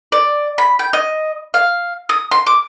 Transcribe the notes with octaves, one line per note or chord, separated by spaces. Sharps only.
D5
B5
G5
D#5
F5
D#6
C6
D6